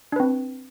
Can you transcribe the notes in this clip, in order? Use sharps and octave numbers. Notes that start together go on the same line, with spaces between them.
C4 D4 B4